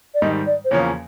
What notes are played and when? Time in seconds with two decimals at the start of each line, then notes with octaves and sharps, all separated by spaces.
0.14 D5
0.22 G#2 D#3 G3 D#5
0.47 D5
0.65 C5
0.71 E2 C#3 F3 A#3 C#4 C#5